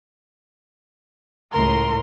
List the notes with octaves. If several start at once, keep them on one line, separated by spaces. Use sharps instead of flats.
C#2 A2 A#4 C6